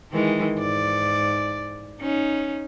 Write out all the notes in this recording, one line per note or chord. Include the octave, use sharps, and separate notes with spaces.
D#3 E3 G#3
G#2 D5
C#4 D#4